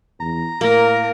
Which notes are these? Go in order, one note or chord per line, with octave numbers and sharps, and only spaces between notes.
E2 A#5
A2 A#3 A#4